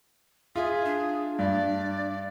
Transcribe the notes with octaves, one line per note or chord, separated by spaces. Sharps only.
F4 G#4 E5
D4
G2 D5